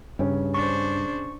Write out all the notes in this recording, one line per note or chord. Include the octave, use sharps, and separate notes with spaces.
G2 C#3 C#4
D4 C5 C#6